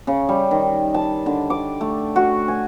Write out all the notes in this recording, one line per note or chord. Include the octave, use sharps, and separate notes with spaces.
C#3
G3
D#3
A5
D3
D6
A3
F#4
G#5